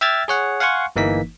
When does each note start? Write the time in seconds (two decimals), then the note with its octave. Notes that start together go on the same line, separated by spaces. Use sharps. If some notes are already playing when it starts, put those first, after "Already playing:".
0.01 E5 G5 E6 F6 G#6 A6
0.28 G#4 C#5 F#5
0.60 F5 F#5 G#5 C6 C#6
0.96 G1 E3 A#3 D#4 B6